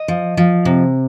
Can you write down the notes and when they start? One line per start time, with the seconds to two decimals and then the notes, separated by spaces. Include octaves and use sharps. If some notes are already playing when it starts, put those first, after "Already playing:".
Already playing: D#5
0.08 F3
0.37 F3
0.65 C3